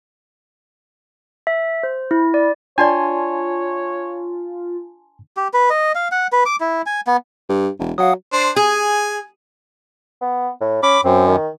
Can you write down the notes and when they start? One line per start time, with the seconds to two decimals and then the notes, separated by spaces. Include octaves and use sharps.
1.47 E5
1.83 C5
2.11 E4
2.34 D5
2.78 D4 F4 C#5 D5 G#5 A5 C6
5.37 G4
5.54 B4
5.70 D#5
5.95 F5
6.12 F#5
6.32 B4
6.46 D6
6.60 E4
6.86 G#5
7.07 B3
7.49 G2
7.79 E1
7.98 F#3 F5 F#5 D#6
8.32 D4 C5
8.56 G#4 G#5
10.21 B3
10.61 A2
10.83 C#4 B5 D6
11.04 F#2 C4
11.27 D#3